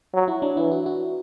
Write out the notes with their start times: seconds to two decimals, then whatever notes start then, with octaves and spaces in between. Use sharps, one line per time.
0.13 F#3
0.28 E4
0.42 D4
0.57 E3 E4
0.71 F#4
0.86 F#4